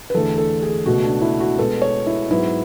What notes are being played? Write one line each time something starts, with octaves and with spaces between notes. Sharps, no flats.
B4
E2 D3 A3 A4
A4
G#4
C#2 B2 A3 F#4
D4
E4
F#4
B2 G#3 B3 A4
C#5
E4
G#2 F#3 B3 E4